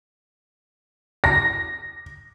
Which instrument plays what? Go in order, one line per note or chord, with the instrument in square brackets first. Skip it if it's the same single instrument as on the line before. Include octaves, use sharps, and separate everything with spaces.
[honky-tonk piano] A#6